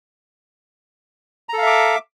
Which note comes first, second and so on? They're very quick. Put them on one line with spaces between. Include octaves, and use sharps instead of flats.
A#5 A4 F5 E5 D6